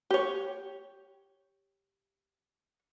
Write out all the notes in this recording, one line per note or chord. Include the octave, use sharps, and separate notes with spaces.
G4 C#5